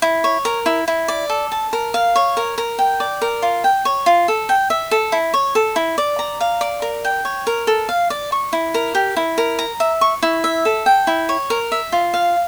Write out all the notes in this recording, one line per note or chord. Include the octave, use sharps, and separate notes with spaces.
E4
C#5
A#4
E4
E4
D5
A4
A5
A#4
F5
C#5
A#4
A#4
G5
D5
A#4
F4
G5
C#5
F4
A4
G5
E5
A4
E4
C#5
A4
E4
D5
A#5
F5
D5
A#4
G5
C#5
A#4
A4
F5
D5
C#6
E4
A#4
G4
E4
A#4
A#5
E5
C#6
E4
E5
A4
G5
E4
C#5
A#4
E5
F4
F5